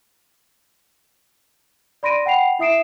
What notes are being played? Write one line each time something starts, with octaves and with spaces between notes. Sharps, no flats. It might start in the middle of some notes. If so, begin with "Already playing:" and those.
D5 B5 C6 A#6 D7 D#7
F#5 G5 B5 C7 F7
E4 E5 D#6 C7 D7 E7